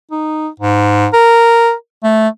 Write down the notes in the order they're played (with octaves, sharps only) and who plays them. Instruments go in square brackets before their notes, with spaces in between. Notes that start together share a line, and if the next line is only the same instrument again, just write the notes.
[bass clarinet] D#4
G#2
A#4
A3